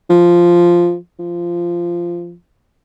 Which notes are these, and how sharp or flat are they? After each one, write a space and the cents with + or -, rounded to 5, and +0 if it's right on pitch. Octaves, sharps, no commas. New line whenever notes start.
F3 -5
F3 -15